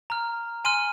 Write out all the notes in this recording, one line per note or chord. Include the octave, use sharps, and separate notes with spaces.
A#5 F6
G#5 C6 F6 D#7